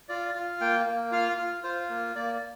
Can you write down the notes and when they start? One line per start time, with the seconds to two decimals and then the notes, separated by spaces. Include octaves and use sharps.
0.09 F4 D5
0.35 F4
0.61 A#3 G5
0.86 A#3
1.12 F4 F5
1.38 F4
1.64 F4 C5
1.90 A#3
2.15 A#3 D5